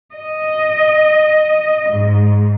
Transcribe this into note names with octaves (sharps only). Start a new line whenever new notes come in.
D#5
G#2